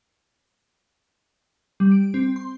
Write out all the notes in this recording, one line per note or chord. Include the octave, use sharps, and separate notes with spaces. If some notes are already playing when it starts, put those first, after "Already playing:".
G3
D7
C4
C6